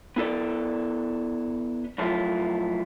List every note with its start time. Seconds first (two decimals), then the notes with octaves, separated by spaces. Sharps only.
0.16 B3 E4 A4 D5
1.98 F#2 F3 F#3 A3 E4 F4